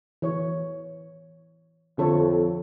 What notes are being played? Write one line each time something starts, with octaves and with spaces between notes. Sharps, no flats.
E3 C#5
F2 D3 A4 C#5